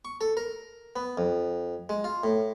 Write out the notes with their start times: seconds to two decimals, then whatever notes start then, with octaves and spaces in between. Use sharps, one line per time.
0.05 C#6
0.21 A4
0.37 A#4
0.96 B3
1.17 F2
1.89 G#3
2.04 F4
2.24 A2